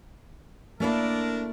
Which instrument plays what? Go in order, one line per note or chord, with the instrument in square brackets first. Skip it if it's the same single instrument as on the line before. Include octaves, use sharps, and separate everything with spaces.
[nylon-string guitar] A3 A#3 E4 [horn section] D4 A#4